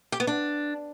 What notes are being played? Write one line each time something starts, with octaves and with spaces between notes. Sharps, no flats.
G4
B3
D4